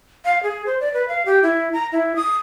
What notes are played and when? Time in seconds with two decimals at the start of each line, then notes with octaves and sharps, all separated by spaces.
0.25 F5
0.43 G#4
0.66 C5
0.80 D5
0.94 B4
1.08 F5
1.26 G4
1.43 E4
1.73 A#5
1.92 E4
2.16 D#6